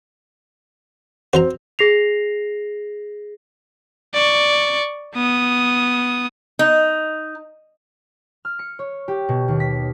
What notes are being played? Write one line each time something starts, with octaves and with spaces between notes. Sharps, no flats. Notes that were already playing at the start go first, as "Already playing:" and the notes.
C4 F#4 C5 A#5
G#4 A#6 C7 F7
D5 C#6
B3 D#6
D#4
F6
C#7
C#5
G4
B2
D#2
B6